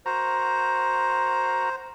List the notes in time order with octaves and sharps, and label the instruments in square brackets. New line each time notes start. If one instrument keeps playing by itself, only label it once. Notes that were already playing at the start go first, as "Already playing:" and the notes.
[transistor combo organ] F#4 A#4 A#5 [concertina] C5